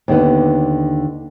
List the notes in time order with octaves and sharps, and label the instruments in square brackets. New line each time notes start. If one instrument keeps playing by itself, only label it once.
[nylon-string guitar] D#2 D3 B3